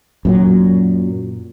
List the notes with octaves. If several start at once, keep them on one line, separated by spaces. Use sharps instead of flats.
F#2 A#2 F#3